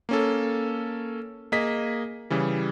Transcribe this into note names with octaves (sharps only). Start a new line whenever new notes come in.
A#3 C#4 A4
A#3 G#4 D#5 B6
C#3 E3 G3